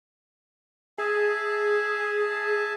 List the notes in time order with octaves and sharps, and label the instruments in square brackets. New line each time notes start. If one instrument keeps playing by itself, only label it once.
[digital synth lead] G#4 [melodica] E5 G#5 A5